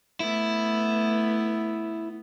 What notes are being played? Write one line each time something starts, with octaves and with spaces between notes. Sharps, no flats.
A3 B3 E4